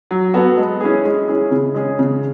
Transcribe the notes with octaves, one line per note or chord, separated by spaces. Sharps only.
F#3
B3 F#4 A4
G#3
C#4 E4 G#4
G#3
C#4 E4 G#4
C#3
G#3 C#4 G#4
C#3